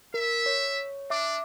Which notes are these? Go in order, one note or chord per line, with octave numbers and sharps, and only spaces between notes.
A#4 E5
C#5
D4 E5 D6